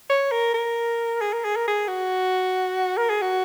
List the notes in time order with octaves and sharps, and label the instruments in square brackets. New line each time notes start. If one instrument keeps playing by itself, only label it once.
[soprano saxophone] C#5
A#4
A#4
G#4
A#4
G#4
A#4
G#4
F#4
A#4
G#4
F#4